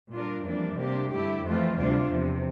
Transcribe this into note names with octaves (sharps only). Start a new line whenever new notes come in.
A#2 G3 D4 F4 A#4
F2 E3 G3 A#3 D4
C3 G3 A#3 D4 G4
G2 D3 A3 E4 G4
F2 E3 A3 C4 F4
D2 C3 G3 D4 F4
E2 C3 F3